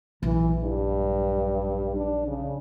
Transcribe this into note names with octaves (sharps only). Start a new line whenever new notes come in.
A#1 E3 F#3
G2
D4
C#3